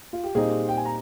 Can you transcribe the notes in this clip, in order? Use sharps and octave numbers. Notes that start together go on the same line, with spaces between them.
F4
G4
A#2 G3 C4 D#4 G#4
G5
G#5
A#5